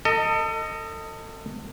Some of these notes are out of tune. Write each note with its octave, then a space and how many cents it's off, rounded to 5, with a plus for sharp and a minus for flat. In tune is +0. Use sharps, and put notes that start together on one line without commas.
A4 +35 D#5 +0